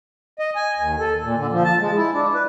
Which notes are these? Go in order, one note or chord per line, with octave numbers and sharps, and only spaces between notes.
D#5
G#5
D#2
A4
A#2
D3
F3
A5
G#3
E4
D4
B4